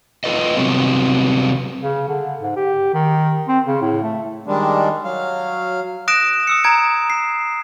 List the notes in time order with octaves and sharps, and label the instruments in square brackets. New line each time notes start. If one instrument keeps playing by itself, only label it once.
[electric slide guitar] F4 A4 B4 D#5
C3 F#3 G3 B3 C4
[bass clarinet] C#3
D3
G#2
G4
D#3
C4
C#3
A2
A3
[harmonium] D#3 G3 G#3 D4
F#3 F5
[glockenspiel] D#6 F#6 A#6 D7 E7
D#6 E6 C#7
A#5 G#6 D7
C7